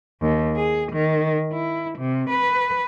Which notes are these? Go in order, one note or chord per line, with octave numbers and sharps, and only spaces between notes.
D#2
G#4
D#3
E4
C3
B4